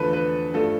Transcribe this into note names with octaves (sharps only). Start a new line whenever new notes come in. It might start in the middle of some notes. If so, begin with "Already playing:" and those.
Already playing: E2 D3 F3 A3 A4 B4
B4
G2 F3 A3 A4